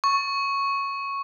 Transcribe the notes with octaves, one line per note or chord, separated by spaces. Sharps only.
C#6